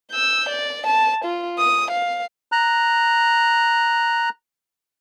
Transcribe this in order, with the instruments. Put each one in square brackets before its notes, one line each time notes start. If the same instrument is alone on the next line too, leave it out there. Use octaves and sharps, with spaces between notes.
[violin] E6 G6
D5
A5
F4
D#6
F5
[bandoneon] A#5 F#6